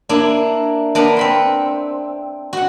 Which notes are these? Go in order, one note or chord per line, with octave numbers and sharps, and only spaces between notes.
A#3 D4 E4
A#3 B3 D4 A#4 F#5
C4 B5 C6
F#4 F#5